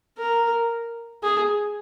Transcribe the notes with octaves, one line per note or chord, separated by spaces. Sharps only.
A#4
G#4